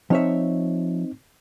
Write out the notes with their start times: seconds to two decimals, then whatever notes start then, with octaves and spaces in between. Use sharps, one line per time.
0.10 F3 C4 D#4 C#5 E5